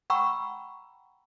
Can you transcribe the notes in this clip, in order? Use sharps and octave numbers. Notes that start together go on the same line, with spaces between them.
F#5 G5 A#5 B5 C#6 E6